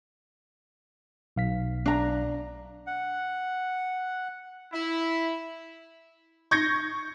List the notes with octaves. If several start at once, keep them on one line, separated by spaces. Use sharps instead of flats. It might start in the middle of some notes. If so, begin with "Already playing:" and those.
B1 F5 B6
D4 A#5
F#5
E4
C#6 G6 G#6 A#6 C#7